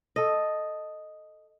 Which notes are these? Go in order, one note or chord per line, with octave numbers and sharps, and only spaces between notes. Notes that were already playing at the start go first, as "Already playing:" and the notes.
A4 D#5